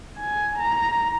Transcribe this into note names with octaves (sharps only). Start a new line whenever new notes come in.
G#5
A#5